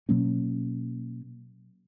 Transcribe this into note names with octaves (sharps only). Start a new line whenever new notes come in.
B2 F#3 A#3 C#4